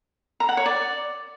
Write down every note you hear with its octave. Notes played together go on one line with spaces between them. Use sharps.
A#5
F#5
C#5
D5